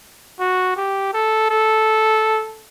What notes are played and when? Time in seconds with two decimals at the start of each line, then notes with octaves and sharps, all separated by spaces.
0.40 F#4
0.77 G4
1.14 A4
1.50 A4